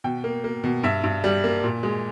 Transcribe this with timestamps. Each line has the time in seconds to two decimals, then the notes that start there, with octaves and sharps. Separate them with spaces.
0.04 B2 G5
0.24 A#3
0.44 A#3
0.64 B2
0.83 G2 E5
1.04 G2
1.24 G3
1.44 A#3
1.64 A#2
1.83 G#3